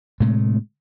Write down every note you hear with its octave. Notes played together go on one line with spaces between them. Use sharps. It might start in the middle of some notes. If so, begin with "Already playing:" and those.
A2 C3 G#3 A3